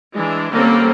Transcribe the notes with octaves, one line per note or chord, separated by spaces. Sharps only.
E3 G#3 D4
D3 G3 A#3 C4 C#4